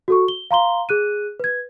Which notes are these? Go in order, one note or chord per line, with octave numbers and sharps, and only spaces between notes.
F#4 A4 C#6
G7
F5 A#5 C6 G7
G#4 F#6 D#7
B4 G#6